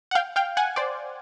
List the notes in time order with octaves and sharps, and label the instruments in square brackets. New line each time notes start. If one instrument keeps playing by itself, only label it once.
[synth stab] F#5
F5 G5
F5 G5
F#5 G#5
C5 D5